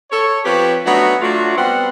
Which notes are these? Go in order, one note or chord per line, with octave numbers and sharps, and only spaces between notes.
A4 C#5
F3 C4 G4 B4 C#5
F#3 A3 B3 D4 D#4 F#4
F#3 A3 D4 F4 F#4
G3 B3 C4 F#5